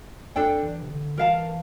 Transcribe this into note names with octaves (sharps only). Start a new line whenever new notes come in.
F2 D4 A4 D5 G5
E3
C3
D3
E3 A#4 F5 A5